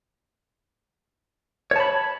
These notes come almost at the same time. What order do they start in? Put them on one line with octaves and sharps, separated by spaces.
C#5 A5 B5